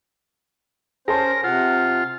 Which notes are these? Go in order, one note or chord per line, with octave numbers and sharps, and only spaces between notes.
C#4 G#4 A#4 C5 A5 C6
C3 F4 F#5